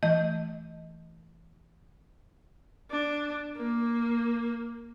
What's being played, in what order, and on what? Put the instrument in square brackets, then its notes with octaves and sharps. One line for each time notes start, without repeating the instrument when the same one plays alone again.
[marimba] E3 A3 D#5 G6
[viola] D4
A#3